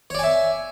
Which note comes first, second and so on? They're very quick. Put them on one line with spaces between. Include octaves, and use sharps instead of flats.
C#5 D5 G#5 E5